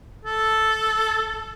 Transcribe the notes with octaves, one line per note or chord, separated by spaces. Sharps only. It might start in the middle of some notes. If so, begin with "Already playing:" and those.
A4